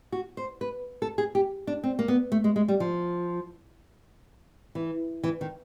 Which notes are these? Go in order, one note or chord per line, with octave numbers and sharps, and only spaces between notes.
F#4
C5
B4
A4
G#4
G4
D4
C4
A#3
B3
A3
G#3
G#3
G3
F3
E3
E3
D#3